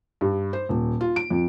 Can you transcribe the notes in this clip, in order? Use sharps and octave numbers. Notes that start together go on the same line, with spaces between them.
G2
C5
D#1
F4
D7
F2